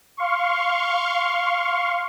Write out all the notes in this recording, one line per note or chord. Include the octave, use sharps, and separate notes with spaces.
F5 C6 C#6